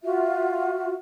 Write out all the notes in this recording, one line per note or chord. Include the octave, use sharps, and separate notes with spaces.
F4 F#4 E5